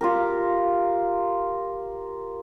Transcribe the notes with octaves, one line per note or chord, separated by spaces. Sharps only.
F4 G4 A#4